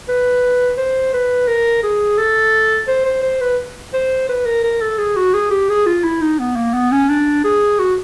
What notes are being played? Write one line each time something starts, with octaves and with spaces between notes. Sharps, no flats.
B4
C5
B4
A#4
G#4
A4
C5
C5
C5
B4
C5
B4
A#4
A#4
A4
G#4
F#4
G#4
G4
G#4
F4
E4
D#4
B3
A#3
B3
C#4
D4
G#4
F#4